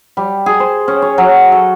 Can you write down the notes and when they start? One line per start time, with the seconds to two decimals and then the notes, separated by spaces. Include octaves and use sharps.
0.17 G3
0.46 G#4
0.60 C5
0.88 C#4
1.02 C#5
1.18 F#3
1.52 A4